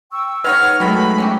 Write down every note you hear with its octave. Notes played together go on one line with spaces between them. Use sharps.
G5 C#6 E6
G#3 D#4 B4 C#5 F#5 F6
B2 D#3 F#3 G#3 A3 B3 B5 C#6
C#4 F#4 G4